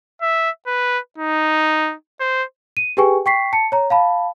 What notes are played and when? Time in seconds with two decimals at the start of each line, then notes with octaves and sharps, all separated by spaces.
0.21 E5
0.67 B4
1.18 D#4
2.20 C5
2.77 D#7
2.97 G4 G#4 B4 G5 G#5 C#6
3.26 G5 C#6 B6 C7
3.53 A5 C#7
3.72 C#5 A#5
3.90 F5 A5 B5